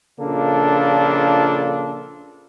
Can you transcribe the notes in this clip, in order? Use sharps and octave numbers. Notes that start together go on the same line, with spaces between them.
A#1 C#3 A#3 D4 F4 A4